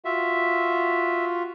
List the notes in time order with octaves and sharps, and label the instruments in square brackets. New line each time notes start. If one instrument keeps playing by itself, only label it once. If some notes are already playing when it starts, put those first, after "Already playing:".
[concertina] F4 F#4 [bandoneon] E5